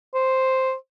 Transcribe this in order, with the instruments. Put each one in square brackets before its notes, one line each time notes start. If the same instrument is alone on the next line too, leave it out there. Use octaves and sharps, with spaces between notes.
[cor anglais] C5